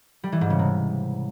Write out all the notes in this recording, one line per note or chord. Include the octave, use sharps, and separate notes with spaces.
G3
E3
G#2
C#3
C3